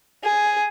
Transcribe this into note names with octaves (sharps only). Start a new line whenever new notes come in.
G#4